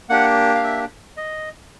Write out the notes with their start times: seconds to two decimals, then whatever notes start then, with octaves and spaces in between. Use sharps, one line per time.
0.09 A#3 D4 G4 F#5
0.55 F5
0.64 E5
1.17 D#5